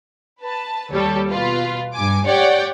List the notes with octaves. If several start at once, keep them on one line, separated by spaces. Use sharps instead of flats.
B4 A5
D#2 G3 A4 C#5
B2 F4 B4
G2 G#5 D6
G4 C#5 D5 F#5 G5